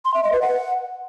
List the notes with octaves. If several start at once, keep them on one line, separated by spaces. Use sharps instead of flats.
C6
E5
D#5
B4
F#5